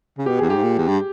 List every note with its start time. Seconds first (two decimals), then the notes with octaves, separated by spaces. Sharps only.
0.17 C#3
0.26 B2 G4
0.38 E2 G#4
0.49 G2 G4
0.56 G#2
0.63 A#2
0.78 E2
0.87 G2